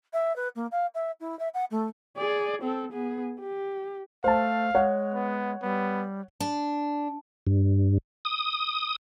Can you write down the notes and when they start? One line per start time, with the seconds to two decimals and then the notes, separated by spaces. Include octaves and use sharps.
0.13 E5
0.36 B4
0.56 A#3
0.72 F5
0.95 E5
1.20 E4
1.39 E5
1.54 F#5
1.71 A3
2.17 G#4 D5
2.63 C4 A4
2.92 B3 G#4
3.40 G4
4.24 A3 C5 F5 A5
4.75 G#3 C#5 F#5
5.14 B3
5.62 G3 B3
6.40 D4
7.47 G2
8.25 D#6